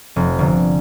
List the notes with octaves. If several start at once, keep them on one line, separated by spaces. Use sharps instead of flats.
F1
G1